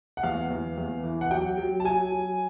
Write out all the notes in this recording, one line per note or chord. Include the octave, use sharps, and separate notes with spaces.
F#5
E2 F5
E2
E2
E3
F#5
F#3 G5
F#3
A5
F#3 G#5
F#3